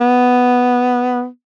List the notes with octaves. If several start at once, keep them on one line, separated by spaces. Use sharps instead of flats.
B3